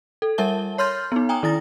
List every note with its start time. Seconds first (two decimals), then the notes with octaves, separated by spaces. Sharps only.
0.22 A4
0.38 G3 A#4 E5 A5 G7
0.78 C#5 C6 F6 G6 A6
1.12 B3 D#4
1.29 G5 G#5 A#5 D#6
1.43 D#3 E4 A6 A#6